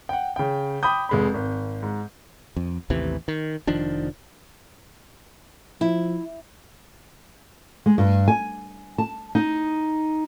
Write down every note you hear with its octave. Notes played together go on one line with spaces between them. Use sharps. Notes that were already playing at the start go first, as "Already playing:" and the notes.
F#5 G5
C#3 G5
G5 B5 D6 D#6 G6
F1 G#3 B5
G#1
G#2
F2
A1 D#2 C3 E3
D#3
F1 D#3 F3 D4
F3 E4
G#3
G2
G#5
A5
D#4